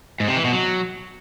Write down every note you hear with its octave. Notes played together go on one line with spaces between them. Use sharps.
G#2
C3
E3
B2
F#3